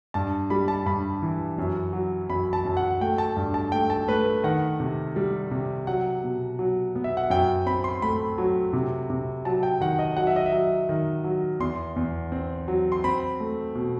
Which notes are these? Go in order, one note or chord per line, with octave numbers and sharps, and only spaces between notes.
G2 A5
G3 B5
A5
G2 B5
E3
F#2
F#3
F#2 B5
A5
F#2
F#5
A3 G5
A5
G2
A5
A3 G5
A5
A3 B4
D#3 F#5
C3
G3
C3
F#3 F#5
B2
F#3
B3
E5
F#5
F#2 G5
C4 B5
C6
A3 B5
F#3
C3
C3
F#3 A5
G5
D#3 F#5
D#5
F#3 F#5
E5
D#5
E5
F#3
D#3
F#3
E2 C6
E2
C4
F#3
C6
C4 B5
A3
B2